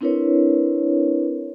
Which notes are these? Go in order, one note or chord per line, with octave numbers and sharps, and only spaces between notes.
C4 D4 E4 A#4 B4 C#5